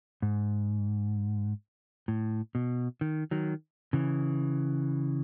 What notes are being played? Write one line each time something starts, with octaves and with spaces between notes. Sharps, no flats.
G#2
A2
B2
D#3
D#3 F#3
C#3 E3